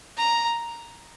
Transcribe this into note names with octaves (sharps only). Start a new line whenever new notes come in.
A#5